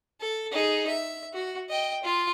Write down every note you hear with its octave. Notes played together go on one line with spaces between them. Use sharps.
A4
D#4 G#4
E5
F#4
D#5 G5
F4